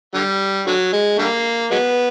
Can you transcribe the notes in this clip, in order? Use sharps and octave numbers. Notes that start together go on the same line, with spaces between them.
D3 G3
D3 F#3
G#3
D3 G3 A#3
F#3 G#3 B3